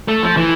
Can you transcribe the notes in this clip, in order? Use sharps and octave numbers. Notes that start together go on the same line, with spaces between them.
A3
F3
E3